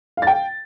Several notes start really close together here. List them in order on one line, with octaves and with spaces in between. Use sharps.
F5 A6 G5